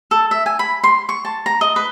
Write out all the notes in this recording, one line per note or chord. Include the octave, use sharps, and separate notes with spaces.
A4
E5
G#5
B5
C6
C#6
A5
A#5
D#5
B4